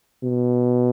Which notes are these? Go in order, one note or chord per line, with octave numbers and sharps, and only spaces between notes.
B2